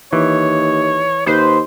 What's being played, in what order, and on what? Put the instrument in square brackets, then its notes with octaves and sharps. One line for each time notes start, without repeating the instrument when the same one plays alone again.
[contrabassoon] D#2 [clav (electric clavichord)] E3 [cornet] C#5
[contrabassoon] D#2 [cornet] B4 [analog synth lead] C5